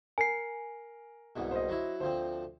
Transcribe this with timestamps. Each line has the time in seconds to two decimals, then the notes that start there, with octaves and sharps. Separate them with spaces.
0.18 A#4 G#5 C7
1.36 C2 G#2 B2
1.51 C5 D#5
1.69 F#3 E4
2.00 D2 F3 C4 C5